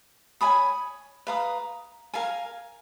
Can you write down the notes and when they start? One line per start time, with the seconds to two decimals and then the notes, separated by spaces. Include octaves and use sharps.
0.41 C#5 G#5 B5 D#6
1.27 B4 F5 A#5 D#6
2.14 A#4 F5 G#5